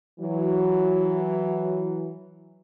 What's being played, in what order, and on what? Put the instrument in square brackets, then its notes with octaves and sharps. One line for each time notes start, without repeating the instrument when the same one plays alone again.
[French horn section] E3 F#3